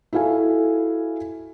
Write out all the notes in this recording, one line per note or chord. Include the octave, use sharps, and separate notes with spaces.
E4 F#4 A4 F5 G#5